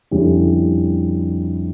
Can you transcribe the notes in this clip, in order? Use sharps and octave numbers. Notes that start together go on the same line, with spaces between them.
F2 D3 G3 C#4 E4